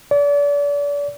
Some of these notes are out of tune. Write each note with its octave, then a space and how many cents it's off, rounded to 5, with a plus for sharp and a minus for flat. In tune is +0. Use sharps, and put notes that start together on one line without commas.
D5 -35